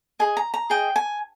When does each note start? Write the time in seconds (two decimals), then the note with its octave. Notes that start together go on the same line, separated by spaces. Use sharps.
0.19 G#4 D#5 G#5
0.37 A#5
0.54 A#5
0.70 G#4 D#5 G5
0.96 G#5